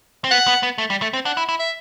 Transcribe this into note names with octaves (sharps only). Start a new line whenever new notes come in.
C4
B3 F#5
B3
B3
A3
G3
A3
C4
D4 F#5
E4
E4
E5